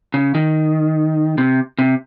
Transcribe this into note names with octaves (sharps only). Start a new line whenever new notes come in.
C#3
D#3
C3
C3